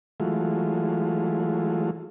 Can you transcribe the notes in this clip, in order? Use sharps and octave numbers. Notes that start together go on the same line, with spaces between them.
E3 F#3 G#3 A3 F4